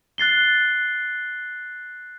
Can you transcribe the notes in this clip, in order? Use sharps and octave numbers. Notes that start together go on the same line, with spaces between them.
F#6 A6 C7 G7